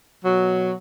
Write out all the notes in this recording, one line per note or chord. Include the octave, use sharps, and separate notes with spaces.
B2 F#3